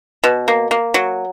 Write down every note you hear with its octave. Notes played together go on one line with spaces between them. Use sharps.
B2
A#3
A#3
F#3